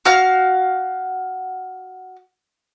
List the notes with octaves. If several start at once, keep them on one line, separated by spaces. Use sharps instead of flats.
F#4 F5 F6